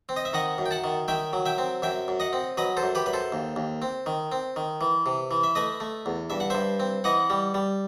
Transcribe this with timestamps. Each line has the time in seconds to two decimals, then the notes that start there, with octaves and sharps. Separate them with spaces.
0.09 C4
0.16 D#5
0.25 E5
0.33 D#3 D#5 F#5
0.58 F#2
0.66 G5
0.71 F#5 A5
0.84 D#3
1.08 D#3 E5 G5
1.33 F#3
1.46 E5 G5
1.58 C4
1.82 F#2 E5 G5
2.08 F#2
2.20 D#5 F#5
2.33 C4
2.57 F#3 B4 D#5
2.77 A4 C5
2.83 F#2
2.95 G4 B4
3.06 F#2 B4
3.13 A4 C5
3.32 D#2
3.56 D#2
3.82 C4
4.06 D#3
4.32 C4
4.56 D#3
4.81 E3
5.06 C3
5.31 E3
5.44 E5
5.55 A3 B4 D#5
5.80 A3
6.06 E2
6.30 G2 E5
6.40 F#5
6.50 G2 C5 E5
6.80 C4
7.04 E3 D#5 F#5
7.30 G3
7.54 G3